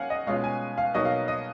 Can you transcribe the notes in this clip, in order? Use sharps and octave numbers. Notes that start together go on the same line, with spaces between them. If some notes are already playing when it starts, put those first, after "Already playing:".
Already playing: F#3 A#3 C#4 F5 F#5 G#5
D#5
B2 G#3 C#4 F4 F5
G#5
F5
B2 F#3 A#3 D#4 D#5
F5
D#5